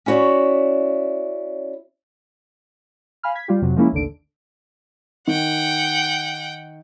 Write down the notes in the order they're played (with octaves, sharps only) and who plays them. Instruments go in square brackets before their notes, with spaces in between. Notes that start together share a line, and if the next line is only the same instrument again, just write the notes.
[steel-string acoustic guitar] C#4 E4 F#4 C#5 D5
[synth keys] F5 G#5 B5 F6
G#6 B6
G3 F4 G4
F2 C3 F#3
F3 G#3 A#3 C#4 E4
A1 D#2 D3 D7
[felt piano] D#3 [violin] F#5 G5